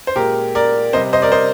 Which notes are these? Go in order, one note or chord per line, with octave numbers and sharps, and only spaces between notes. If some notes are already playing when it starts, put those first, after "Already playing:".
C5
A#2 G#3 G4 A#4
A#4 D5
C3 G3 C5 D#5
C5 D#5
A#4 D5
C5 D#5